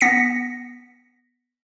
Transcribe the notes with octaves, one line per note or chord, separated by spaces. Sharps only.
B3 A#6 B6 C#7